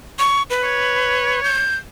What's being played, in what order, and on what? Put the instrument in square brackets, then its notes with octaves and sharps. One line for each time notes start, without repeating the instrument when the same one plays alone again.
[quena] C#6
B4
[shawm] C#5
[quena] G6